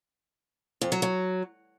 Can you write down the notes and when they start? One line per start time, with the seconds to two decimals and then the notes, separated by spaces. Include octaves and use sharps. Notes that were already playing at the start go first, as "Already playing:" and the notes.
0.81 F2
0.92 F#3
1.02 F#3